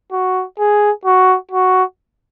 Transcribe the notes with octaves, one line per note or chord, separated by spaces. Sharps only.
F#4
G#4
F#4
F#4